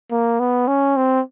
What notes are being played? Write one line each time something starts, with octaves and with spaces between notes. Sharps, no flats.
A#3
B3
C#4
C4